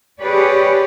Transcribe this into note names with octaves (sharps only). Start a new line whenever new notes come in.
G4 G#4 B4 C#5 D5